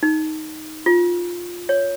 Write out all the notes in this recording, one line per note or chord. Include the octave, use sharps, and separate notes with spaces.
D#4
F4
C#5